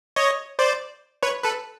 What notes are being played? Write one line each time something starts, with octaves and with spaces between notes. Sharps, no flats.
C#5 D#5
C5 D5
B4 C#5
A4 B4